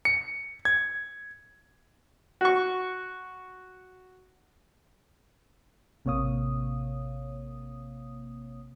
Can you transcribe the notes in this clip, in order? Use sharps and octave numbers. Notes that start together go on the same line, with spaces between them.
C#7
G#6
F#4 C#6
A1 C3 A#3 C#5 F5 D#6